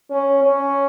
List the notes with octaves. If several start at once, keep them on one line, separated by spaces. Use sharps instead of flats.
C#4
C#4